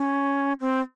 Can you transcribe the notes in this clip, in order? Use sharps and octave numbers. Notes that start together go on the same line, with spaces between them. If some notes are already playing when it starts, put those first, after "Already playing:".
Already playing: C#4
C4